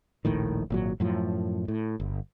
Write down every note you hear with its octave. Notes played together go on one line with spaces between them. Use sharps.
D#1 A#1 A2 D#3
G#1 A#2 F#3
F#2 A2 F3
A2
G1